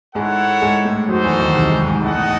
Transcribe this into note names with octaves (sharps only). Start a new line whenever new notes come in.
G#2 G#3 E4 A4 C#5 F#5
G#2 G#3
A2 A3
F#2 F#3 D#4 F#4 A4 C5
E2 E3
D#2 D#3
C2 C3
G#2 G#3
G#2 G#3
E2 E3 D#4 A4 D#5 F#5
A2